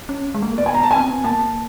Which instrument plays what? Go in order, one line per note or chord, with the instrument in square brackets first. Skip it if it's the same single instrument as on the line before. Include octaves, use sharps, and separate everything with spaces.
[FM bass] C#4
G#3
A3
A#3
[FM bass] B3 [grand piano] D5
[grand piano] G#5
A#5
A5
G#5
[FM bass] C4
B3
[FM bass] A#3 [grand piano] A5